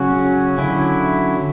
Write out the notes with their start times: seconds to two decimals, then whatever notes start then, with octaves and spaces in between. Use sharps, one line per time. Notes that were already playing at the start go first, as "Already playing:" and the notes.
Already playing: C#3 F#3 C#4 F#4
0.58 D3 F#3 C#4 E4